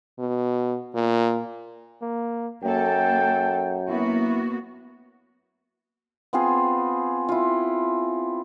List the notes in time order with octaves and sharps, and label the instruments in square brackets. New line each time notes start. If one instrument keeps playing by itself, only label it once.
[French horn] B2
A#2
[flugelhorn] A#3
[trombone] F#2 [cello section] A#3 A4 [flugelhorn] G5
[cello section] A#3 B3 F#4 [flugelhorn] E4
[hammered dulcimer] B3 C4 F4 G#4
E4 F4